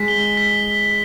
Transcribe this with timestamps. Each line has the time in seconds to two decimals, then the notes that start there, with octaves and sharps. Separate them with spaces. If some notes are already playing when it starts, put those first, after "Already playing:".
Already playing: G#3 B6
0.08 G7
0.37 B6